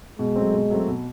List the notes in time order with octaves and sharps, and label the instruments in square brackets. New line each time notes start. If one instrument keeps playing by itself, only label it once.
[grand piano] B2 [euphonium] G#3
[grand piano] F#3 A3 C4
B2
F#3 A3 C4
B2